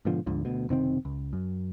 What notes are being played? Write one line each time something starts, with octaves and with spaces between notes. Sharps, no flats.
G#2 B2 D3 F3
D2 G#2 D3 F3
D2 B2
F#1 C3 D#3 C4
C#2
F#2